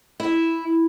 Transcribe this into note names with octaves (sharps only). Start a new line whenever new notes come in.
E4